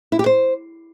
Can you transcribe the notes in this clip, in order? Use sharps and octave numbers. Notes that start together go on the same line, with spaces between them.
E4
G4
C5